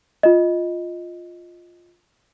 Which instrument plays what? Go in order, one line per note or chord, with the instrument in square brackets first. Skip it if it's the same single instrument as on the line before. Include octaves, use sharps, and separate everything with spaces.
[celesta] F4 D#5